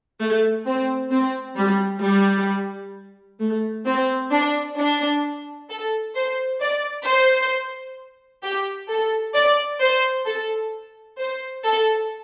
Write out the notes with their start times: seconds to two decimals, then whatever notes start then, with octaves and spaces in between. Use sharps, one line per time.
0.20 A3
0.66 C4
1.11 C4
1.57 G3
2.03 G3
3.40 A3
3.86 C4
4.32 D4
4.78 D4
5.69 A4
6.15 C5
6.61 D5
7.06 C5
8.43 G4
8.89 A4
9.35 D5
9.81 C5
10.26 A4
11.18 C5
11.64 A4